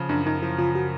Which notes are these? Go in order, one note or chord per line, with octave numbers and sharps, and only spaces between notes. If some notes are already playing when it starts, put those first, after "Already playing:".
Already playing: C#3 F3
F#2 D4
F#2 D#4
F3 E4
C#3 F4
F#4